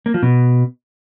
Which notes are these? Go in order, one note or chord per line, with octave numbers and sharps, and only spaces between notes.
A#3
F3
B2